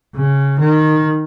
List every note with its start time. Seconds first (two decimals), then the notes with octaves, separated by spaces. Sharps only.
0.15 C#3
0.59 D#3